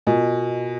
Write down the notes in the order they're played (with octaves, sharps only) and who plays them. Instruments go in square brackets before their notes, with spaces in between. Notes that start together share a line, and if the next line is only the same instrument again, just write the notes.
[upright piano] B2 [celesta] F4 A#4 D#5 G#5